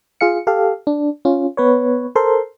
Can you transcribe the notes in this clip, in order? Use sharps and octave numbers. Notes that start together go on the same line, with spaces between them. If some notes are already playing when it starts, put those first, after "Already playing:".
F4 G#4 F5 C#7
G4 A4 F5
D4
C#4 F4
B3 B4 C#5
A4 A#4 C5 C6